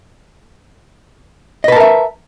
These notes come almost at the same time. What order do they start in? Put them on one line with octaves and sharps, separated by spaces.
D#5 B4 A5 A#4 E5